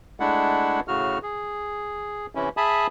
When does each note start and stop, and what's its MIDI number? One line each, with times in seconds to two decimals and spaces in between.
0.20 0.80 56
0.20 0.80 57
0.20 0.80 62
0.20 0.80 64
0.20 0.80 78
0.88 1.18 45
0.88 1.18 49
0.88 1.18 66
0.88 1.18 89
1.23 2.26 68
2.35 2.49 48
2.35 2.49 52
2.35 2.49 61
2.35 2.49 64
2.57 2.87 68
2.57 2.87 76
2.57 2.87 80
2.57 2.87 81
2.57 2.87 83
2.57 2.87 87